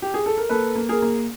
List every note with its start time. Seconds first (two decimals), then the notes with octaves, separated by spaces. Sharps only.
0.02 G4
0.14 G#4
0.26 A4
0.37 A#4
0.50 A#3 A4 B4
0.76 A#3
0.89 G#4 A#4
1.02 A#3